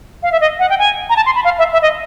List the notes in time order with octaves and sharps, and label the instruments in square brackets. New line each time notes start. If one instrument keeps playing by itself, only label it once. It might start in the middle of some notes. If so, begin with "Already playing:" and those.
[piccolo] F5
E5
D#5
F#5
G5
G#5
A#5
A5
C6
B5
F5
E5
E5
D#5